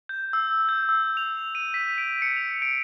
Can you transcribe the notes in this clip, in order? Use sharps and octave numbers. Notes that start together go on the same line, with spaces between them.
G6
E6
G6
E6
F7
D#7
B6
D7
C#7
F7
D7